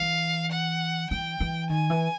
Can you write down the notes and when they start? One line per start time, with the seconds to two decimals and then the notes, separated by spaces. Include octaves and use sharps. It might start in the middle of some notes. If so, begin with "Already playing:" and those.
Already playing: E3 F5
0.52 F#5
1.11 E3 G5
1.40 E3
1.70 D#3 G#5
1.90 E3